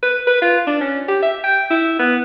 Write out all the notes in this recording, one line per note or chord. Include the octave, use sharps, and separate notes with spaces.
B4
B4
F4
D4
C#4
G4
E5
G5
E4
B3